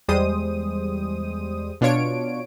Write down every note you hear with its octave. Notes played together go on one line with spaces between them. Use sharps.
E2 G3 G#3 C5 D#6 D#7
B2 D4 F4 C#5 D7